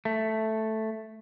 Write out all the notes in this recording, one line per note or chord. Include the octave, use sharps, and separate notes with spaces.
A3